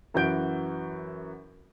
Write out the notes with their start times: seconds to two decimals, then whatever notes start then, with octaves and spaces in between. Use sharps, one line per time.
0.14 F#2 E3 F#4 G6 D7